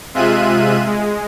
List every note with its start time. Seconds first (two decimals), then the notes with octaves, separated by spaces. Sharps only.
0.14 C3 G#3 F4 E5 F#6 D#7
0.86 G#3